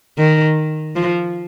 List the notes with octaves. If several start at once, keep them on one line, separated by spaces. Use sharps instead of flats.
D#3
F3